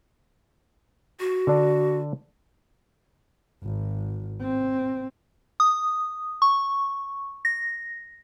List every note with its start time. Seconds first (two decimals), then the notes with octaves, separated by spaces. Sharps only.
1.20 F#4
1.47 D3 D4
3.63 G#1
4.41 C4
5.60 D#6
6.42 C#6
7.45 A#6